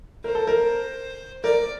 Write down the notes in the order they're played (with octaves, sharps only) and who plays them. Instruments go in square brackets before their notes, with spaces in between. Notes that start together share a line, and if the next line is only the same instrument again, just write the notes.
[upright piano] A#4 [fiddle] C5
[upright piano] A4
A#4
[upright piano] A#4 [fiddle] D5